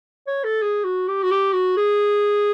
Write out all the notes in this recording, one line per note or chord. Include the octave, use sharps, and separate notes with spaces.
C#5
A4
G#4
F#4
G4
F#4
G4
F#4
G#4